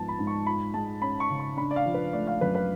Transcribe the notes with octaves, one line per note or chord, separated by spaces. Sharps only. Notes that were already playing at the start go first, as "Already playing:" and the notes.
Already playing: G#2 F3 B3 A5
B5
G#2
C#6
F4 B5
G#3 A5
C#4 B5
C#6
C#3
C#6
D4 B5
D5
F5
F3
B4
A3 D5
F5
F#2 B4
B4